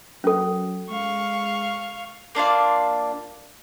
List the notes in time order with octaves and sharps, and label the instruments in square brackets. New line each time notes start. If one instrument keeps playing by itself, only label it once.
[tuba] F#3 [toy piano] C#4 A4
[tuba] G#3 [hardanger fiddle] F5 C#6
[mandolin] A#3 D4 F4 F5